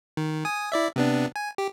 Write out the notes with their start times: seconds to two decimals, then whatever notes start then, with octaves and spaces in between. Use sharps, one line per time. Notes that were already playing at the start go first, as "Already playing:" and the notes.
0.17 D#3
0.45 G#5 D#6
0.72 E4 D5 E5
0.96 C3 B3 D4
1.36 G#5
1.58 G4